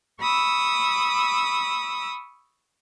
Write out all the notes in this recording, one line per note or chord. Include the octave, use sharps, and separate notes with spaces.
B5 C#6 D#6 E6